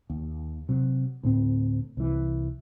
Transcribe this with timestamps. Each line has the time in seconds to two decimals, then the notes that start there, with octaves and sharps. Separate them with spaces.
0.10 D#2
0.69 C3 F#3
1.23 D2 A2 C4
1.97 C2 E3